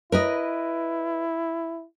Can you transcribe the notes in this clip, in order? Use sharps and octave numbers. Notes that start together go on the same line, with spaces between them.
E4 A#4 B4 D#5